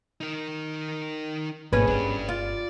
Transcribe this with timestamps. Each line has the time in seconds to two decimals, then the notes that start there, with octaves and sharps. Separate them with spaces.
0.21 D#4 A#4
1.73 G#1 B2 A#3 C#4 G#4 B4
1.87 G1 A3 D4 G4
2.29 F4 D5